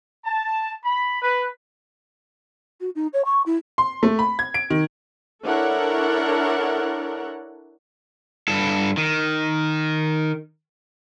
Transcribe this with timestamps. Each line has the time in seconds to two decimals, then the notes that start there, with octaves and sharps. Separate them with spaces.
0.24 A5
0.84 B5
1.22 B4
2.80 F#4
2.95 D#4
3.13 C#5
3.25 C#6
3.46 E4
3.78 C6
4.03 A3
4.19 B5
4.39 G#6
4.54 D7
4.70 D#3
5.44 D4 E4 A4 A#4 C#5 F#5
8.48 G2 A4
8.97 D#3